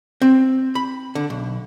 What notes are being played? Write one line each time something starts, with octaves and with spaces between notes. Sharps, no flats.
C4
B5
D3
B1